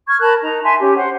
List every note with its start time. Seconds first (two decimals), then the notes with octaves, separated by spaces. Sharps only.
0.08 C#6 F6 G#6
0.20 A#4 A5 B5 F#6
0.42 D#4 A#5
0.63 E5 G#5 A5 C6
0.80 C#4 G4
0.97 C5 F#5